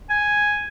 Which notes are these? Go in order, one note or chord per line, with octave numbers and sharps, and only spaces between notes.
G#5